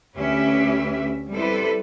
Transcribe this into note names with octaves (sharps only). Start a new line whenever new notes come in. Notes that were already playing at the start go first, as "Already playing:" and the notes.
D2 C#4 G4 B4 E5
G3 C4 E4 A4 B4 C5